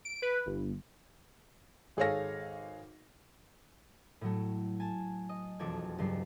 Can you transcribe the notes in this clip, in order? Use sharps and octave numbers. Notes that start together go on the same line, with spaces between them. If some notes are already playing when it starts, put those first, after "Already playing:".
D7
B4
G1
G#1 G#4 A4 C#5 F5 A#6
A2 F#3 A3
G#5 A5
D#5
E1 B1 F2 A4 D6 G#6
C#2 G2 F#3 C7